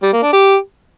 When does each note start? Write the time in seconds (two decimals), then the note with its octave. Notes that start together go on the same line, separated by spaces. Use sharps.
0.03 G3
0.13 A#3
0.23 D4
0.33 G4